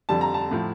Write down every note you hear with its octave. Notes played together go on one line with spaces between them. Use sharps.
F2 D3 G3 A5
A#5
A5
A2 F3